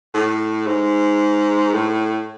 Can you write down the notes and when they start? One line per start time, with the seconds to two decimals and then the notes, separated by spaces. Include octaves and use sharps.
0.14 A2
0.67 G#2
1.74 A2